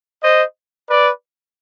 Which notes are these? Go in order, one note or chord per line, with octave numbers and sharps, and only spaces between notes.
C5 D#5
B4 D5